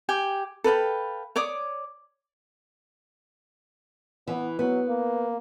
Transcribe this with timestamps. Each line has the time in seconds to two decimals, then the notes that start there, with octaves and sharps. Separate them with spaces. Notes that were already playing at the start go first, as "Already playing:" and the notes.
0.09 G4 G5 G#5
0.64 A4 B4 F5 G5
1.36 C#5 D5 D6 D#6
4.27 E3 B3
4.59 F#3 B3
4.88 A#3